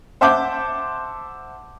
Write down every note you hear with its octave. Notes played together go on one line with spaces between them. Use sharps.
C5 E5 F#5 A5 D6 G6